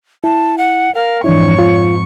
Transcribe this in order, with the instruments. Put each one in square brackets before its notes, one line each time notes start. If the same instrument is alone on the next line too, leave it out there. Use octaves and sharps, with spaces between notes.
[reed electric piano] E4 [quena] A5
[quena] F#5
[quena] A#4 [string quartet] F5
[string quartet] F2 G#2 C#6 [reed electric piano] E3 D4 E4 [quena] C#5
[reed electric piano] F4